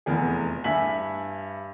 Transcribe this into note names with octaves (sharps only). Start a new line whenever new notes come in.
F1 E2 G#4
G2 E5 G#5 B6 F#7